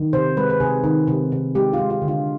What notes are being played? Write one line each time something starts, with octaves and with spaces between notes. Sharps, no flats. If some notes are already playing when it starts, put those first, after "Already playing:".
Already playing: D#3
C3 C5
G#3 B4
B4
C3 G#4
D#3
C3
C3
G#3 G4
G#3 F4
F4
D3
F4